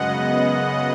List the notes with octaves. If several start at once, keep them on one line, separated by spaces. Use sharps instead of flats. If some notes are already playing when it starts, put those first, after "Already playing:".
Already playing: F#2 C#3 G#3 B3 D#5 F#5